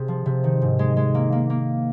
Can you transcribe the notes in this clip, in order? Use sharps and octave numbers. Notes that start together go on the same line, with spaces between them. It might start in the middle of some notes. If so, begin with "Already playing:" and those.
Already playing: C3 G#4
F3
C3
D#3
G#2
G#3
G#3
A#3
A#3
A#3